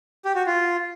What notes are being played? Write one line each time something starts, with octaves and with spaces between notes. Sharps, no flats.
G4
F#4
F4